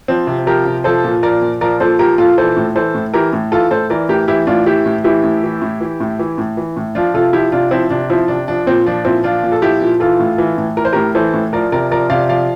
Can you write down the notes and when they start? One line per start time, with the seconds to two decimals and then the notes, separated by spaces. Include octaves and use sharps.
0.08 F3 C4
0.27 C3
0.46 F3 G4 A#4
0.65 C3
0.84 F3 A4 C5
1.04 A#2
1.23 F3 A#4 D5
1.42 A#2
1.61 F3 A#4 D5
1.80 A#2 A4 C5
1.99 F3 G4 A#4
2.18 A#2 F4 A4
2.38 E3 A4 C5
2.57 A2
2.75 E3 A4 C5
2.94 A2
3.14 E3 G4 A#4
3.33 A2
3.52 E3 F4 A4
3.71 A2 A4 C5
3.90 E3 A#4 D5
4.09 A2 G4 A#4
4.28 E3 E4 G4
4.47 A2 D4 F4
4.66 E3 E4 G4
4.86 A2
5.04 E3 E4 G4
5.23 A2
5.43 E3
5.62 A2
5.81 E3
6.00 A2
6.19 E3
6.38 A2
6.57 E3
6.76 A2
6.95 F3 D4 F4
7.14 C3 F4 A4
7.33 F3 E4 G4
7.52 C3 D4 F4
7.71 F3 C4 E4
7.90 C3 D4
8.10 F3 C4 E4
8.28 C3 D4
8.48 F3 D4
8.67 A#2 C4
8.86 F3 D4
9.05 A#2 C4 E4
9.24 F3 D4 F4
9.43 A#2
9.52 A4
9.62 F3 E4 G4
9.81 A#2
10.00 E3 F4 A4
10.20 A2
10.38 E3
10.57 A2
10.77 E3 A#4
10.85 C5
10.93 A2 G4 A#4
11.15 E3 A4 C5
11.34 A2
11.53 F3 A#4 D5
11.72 C3 A#4 D5
11.91 F3 A#4 D5
12.10 C3 D5 F5
12.29 F3 D5 F5